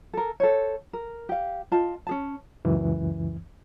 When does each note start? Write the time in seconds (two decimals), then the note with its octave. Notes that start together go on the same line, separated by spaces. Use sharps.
0.13 A4 A#4
0.40 A4 C5 C#5
0.93 A#4
1.29 G4 F5
1.72 F4 D#5 A5
2.07 C#4 G#4 A5
2.65 C#2 F#2 E3